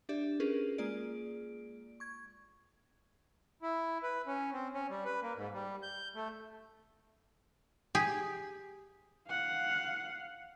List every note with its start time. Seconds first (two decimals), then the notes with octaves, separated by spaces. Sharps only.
0.09 D4 G4 D5 E5
0.40 C#4 F4 G#4 A#4 B4
0.78 G#3 A#3 F4 G#4 D5 D7
2.00 C#6 G#6
3.62 E4
4.03 B4
4.27 C#4
4.53 C4
4.74 C#4
4.90 G3
5.05 B4
5.22 A#3
5.36 G#2
5.54 G3
5.83 G6
6.15 A3
7.95 G4 G#4
9.28 F5 F#5